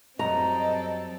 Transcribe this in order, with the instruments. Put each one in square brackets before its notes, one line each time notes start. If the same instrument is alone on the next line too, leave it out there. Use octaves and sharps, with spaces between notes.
[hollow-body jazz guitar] F#2 F#3 G3 [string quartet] C4 A4 [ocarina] D#5 [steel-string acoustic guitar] A#5